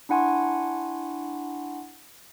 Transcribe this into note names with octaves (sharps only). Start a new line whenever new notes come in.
D4 E4 F#5 G#5 C6 C#6